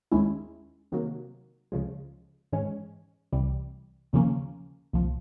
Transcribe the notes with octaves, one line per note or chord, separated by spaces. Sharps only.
D#2 D#3 G#3 C#4 E4
C3 D#3 F#3 A#3
C#2 C#3 F3 G#3
G#2 E3 G#3 C#4
C2 C3 E3 G3
D#2 C#3 F3 A#3 C#4
C2 A#2 F3